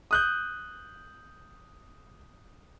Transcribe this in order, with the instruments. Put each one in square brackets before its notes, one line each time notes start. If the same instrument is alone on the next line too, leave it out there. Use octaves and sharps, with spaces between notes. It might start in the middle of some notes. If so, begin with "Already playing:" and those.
[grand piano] D#6 F#6 G6